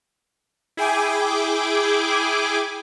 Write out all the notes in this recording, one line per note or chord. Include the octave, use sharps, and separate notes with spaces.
E4 G#4 G5 G#5 D6